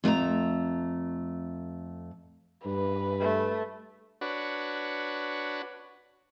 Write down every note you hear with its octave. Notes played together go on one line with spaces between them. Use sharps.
F2 A3 A5 A#5
G2 B4
A3
D4 F#4 B4 C#5